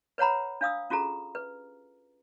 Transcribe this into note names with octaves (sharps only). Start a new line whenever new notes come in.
B4 C#5 F#5 A#5 B5
D4 F5 D#6 E6
C#4 F4 F#4 G#4 A4 A#5
B4